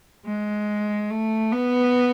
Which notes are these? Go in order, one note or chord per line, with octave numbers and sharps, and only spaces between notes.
G#3
A3
B3